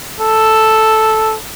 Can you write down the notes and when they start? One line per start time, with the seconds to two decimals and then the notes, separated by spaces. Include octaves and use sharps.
0.20 A4